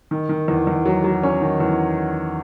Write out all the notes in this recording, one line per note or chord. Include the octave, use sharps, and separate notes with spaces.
D#3
D#3
E2
E2
F#3
F#3
C#4
D#3
E2